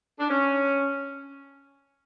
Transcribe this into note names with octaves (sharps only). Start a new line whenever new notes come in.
D4
C#4